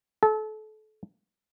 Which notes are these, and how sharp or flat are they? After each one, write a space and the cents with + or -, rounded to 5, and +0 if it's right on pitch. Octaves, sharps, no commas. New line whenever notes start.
A4 -30